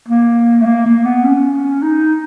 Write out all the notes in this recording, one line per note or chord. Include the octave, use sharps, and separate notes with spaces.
A#3
A3
A#3
A#3
B3
C#4
D#4